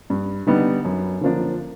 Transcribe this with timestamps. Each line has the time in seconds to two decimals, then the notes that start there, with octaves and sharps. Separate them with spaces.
0.10 G2
0.47 D3 G3 B3 D#4
0.85 F#2
1.21 D3 F3 A#3 D4